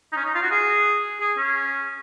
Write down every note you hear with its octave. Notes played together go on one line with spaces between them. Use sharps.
D#4
C#4
D#4
F4
F#4
G#4
G#4
C#4